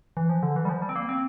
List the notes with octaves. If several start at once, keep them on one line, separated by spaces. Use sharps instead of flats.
E3
F3
D3
E3
G3
F3
G3
C4
A#3
C4